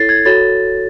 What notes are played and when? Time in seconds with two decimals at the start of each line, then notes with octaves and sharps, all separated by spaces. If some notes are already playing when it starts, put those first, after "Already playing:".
Already playing: E4 A4 C#5 A6 C7
0.09 G#6
0.25 F#4 A4 C#5 A6